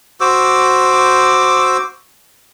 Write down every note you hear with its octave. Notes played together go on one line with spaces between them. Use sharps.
F#4 C5 D6 E6